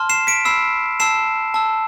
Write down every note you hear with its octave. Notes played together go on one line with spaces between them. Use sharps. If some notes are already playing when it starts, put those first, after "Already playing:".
Already playing: A5 C6 F6
C7 E7
B6 D7
B5 E6 C7 E7
A5 E6 C7 E7
A5 E6